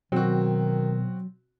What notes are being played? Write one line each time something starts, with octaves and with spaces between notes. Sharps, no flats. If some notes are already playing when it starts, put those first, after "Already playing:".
B2 D#3 F#3 C4 F#4